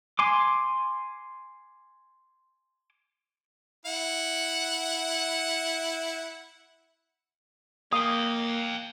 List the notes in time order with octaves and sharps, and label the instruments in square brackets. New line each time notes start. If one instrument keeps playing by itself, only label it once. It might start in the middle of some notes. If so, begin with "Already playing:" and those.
[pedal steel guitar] G#5 C6 D6
[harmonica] E4 F#5
[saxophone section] A#3 [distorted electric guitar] F5 G5 [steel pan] D#6